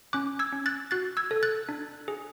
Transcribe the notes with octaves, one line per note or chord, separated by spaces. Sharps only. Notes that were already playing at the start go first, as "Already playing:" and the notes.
C#4 D6 F#6
E6 G#6
C#4
F#6 A6
F#4 F#6 A6
E6 G#6
A4
F#6 A6
D4
G#4